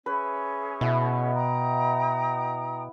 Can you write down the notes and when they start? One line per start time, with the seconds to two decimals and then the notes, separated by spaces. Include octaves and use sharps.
0.06 C#4 G#4 B4 E5
0.81 B2 B3 E4
1.34 G5 A#5 D#6